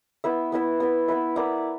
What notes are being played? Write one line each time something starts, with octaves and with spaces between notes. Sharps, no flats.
B3 E4 B4 E5
B3 E4 B4 E5
B3 E4 B4 E5
B3 E4 B4 E5
B3 E4 A#4 D5